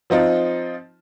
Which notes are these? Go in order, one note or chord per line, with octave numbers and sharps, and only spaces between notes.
F3 C4 D#4 F4